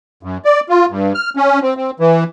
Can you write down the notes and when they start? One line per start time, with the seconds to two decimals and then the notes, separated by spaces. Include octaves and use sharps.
0.23 F#2
0.45 D5
0.69 F4
0.89 G2
1.14 F6
1.36 C#4
1.62 C4
1.77 C4
2.00 E3